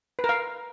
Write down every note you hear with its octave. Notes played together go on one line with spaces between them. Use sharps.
B4
A#4
F5